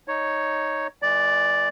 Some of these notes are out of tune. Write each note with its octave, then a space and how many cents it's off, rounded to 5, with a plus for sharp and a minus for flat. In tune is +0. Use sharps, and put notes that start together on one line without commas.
D#4 +0 C#5 +0
E3 +0 G#3 +35 D5 +0